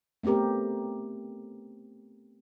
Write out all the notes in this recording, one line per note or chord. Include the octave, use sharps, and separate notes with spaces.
A3 B3 C4 G4 A#4